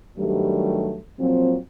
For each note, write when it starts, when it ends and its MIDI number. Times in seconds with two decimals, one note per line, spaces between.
0.18 0.97 43
0.18 0.97 51
0.18 0.97 54
0.18 0.97 55
0.18 0.97 57
1.20 1.57 46
1.20 1.57 53
1.20 1.57 54
1.20 1.57 60